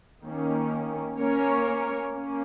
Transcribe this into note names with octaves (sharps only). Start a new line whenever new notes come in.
D#3 A#3 C#4
A#3 C#4 A#4 C#5
A#3 C#4